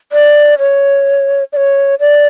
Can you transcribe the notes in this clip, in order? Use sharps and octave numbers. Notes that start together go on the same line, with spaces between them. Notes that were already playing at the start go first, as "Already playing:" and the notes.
D5
C#5
D5
C#5
D5